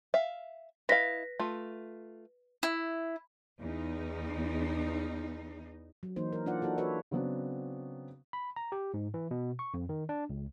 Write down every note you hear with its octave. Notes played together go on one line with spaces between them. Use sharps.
E5 F5
E4 B4 D#5 F5 A#6 B6
A3 F4
E4
E2 D#4
F#3
E3 A#3 D#4 C5
A#4
A#3 D4 F4 D5 F#5
A#3 D#4 E4 F#4 A4
F#4 A4 B4 C#5 E5
C#3 F#3 B3 C4 D4
B5
A#5
G4
G#2
E3
B2
C#6
F2
D#3
D4
C#2